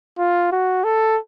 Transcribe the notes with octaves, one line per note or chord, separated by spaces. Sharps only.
F4
F#4
A4